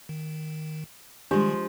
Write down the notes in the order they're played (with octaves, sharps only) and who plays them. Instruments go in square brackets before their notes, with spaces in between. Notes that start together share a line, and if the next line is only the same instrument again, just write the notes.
[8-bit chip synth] D#3
[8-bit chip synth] D#3 G3 [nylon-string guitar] F3 G#3 [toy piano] D4 G4